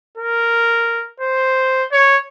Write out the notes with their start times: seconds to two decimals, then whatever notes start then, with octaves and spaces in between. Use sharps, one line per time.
0.17 A#4
1.20 C5
1.92 C#5